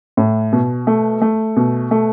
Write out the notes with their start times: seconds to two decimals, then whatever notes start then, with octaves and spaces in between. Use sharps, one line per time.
0.17 A2
0.53 B2
0.87 A3
1.22 A3
1.57 B2
1.91 A3